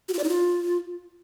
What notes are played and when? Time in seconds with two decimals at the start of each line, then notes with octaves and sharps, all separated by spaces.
0.09 F#4
0.14 F4
0.19 D5
0.24 D#4
0.29 F4